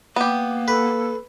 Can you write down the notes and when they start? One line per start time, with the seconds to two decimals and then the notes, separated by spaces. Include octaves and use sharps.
0.16 A#3 B3 G4
0.68 A4 B4